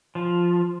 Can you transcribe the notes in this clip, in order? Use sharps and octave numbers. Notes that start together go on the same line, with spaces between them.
F3